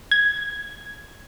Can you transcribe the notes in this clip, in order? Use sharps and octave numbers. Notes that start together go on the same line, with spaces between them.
G#6